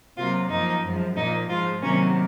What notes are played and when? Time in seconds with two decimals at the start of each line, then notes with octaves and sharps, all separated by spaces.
0.17 C3 F#3 A#3 F4
0.49 F#2 F3 A#3 D#4
0.82 F#2 F3 G#3
1.16 A#2 F3 A#3 D#4
1.49 G#2 F3 G#3 F4
1.82 C3 D#3 F#3 A#3 C#4